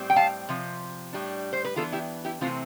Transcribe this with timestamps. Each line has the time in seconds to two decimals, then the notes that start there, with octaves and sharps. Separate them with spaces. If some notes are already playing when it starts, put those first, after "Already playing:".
Already playing: A2 G3 C4
0.10 G5
0.16 F5 A5
0.49 C3 F3
1.13 A2 G3 D4
1.53 C5
1.65 B4
1.76 E3 B3 D4 F4 A4
1.92 E4 G4
2.25 E4 G4
2.41 C3 E3 A3 C4 F4